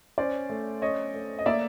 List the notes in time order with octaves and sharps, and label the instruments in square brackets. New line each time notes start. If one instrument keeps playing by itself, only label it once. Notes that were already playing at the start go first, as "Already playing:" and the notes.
[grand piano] C#4 [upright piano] C5 D5
[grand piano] A3
[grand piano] C#4 [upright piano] C#5 D#5
[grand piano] A3
[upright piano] D#5
[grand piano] A#3 [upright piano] D5 E5